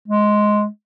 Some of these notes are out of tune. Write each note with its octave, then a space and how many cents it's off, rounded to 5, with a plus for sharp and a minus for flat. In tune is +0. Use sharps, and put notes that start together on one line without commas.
G#3 +10